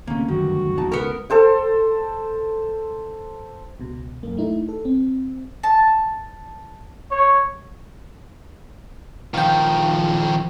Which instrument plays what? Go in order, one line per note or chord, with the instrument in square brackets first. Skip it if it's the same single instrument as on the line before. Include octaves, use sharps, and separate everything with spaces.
[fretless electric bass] D2 C3 [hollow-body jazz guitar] A#3 C#4
[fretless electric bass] F#1 D2 G2 [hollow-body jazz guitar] D#3 [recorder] F#4
[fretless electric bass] E1 E2 [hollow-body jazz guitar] D#4 A5
[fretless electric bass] C#2 [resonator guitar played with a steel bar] B3 A#4
[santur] A4 C5 G5
[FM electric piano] C#2 B2
B1 F#2 A#3
A3 D#4 E4
A4
C4
[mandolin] A5
[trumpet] C#5
[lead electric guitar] D#3 F3 [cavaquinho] F5 G5